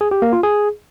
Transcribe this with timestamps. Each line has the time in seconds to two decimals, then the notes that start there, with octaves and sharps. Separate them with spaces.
0.01 G#4
0.11 G4
0.22 A#3
0.33 F4
0.43 G#4